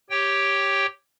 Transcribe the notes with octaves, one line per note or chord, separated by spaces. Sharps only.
G4 C#5 G5